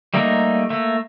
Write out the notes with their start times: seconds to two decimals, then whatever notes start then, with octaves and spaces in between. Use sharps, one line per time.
0.14 G3 A3 A#3 D#4
0.70 A3 A#3